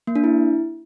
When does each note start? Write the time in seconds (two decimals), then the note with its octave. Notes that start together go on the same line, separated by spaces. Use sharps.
0.07 A#3
0.16 D4
0.24 E4